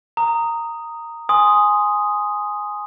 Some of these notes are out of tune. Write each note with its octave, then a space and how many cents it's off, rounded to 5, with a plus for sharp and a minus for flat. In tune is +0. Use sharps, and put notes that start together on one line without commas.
A#5 -10 D#6 +0
G#5 +0 C6 +0 D#6 +0